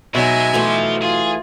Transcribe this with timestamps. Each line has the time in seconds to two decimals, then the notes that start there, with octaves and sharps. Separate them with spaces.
0.15 B2 F#3 G#3 D#4 E5 G#5
0.54 E3 F3 A3 F4 F#4
1.02 F4 G#4